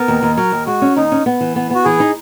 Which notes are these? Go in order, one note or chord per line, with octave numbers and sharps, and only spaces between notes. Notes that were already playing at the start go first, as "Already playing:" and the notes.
Already playing: B3 A#4
D#2
D#2
F#3 A#4
D#2
G#3 F#4
C#4
D#2 D#4
C#4
B3
E3
B3
B3 F#4
E3 G#4
D#4